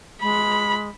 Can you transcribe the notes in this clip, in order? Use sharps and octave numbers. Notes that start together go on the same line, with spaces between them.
G#3 B5